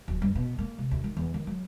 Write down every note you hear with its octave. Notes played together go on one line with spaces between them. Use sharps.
D1
G2
B2
A#3
C3
D2
D#3
E2
D#3
F#3